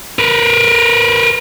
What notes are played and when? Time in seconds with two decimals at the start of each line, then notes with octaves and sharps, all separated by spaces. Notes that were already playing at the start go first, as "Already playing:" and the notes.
0.19 A#4 B4